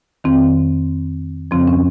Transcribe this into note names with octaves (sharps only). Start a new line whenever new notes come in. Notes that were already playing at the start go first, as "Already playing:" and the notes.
F2 D#3 C4
F2 C#3 F3 C4
C#4